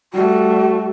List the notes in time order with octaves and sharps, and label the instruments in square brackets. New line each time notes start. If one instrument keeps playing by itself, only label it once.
[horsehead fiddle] G3 A3 [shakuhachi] F#4